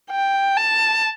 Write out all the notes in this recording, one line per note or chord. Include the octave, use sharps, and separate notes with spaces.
G5
A5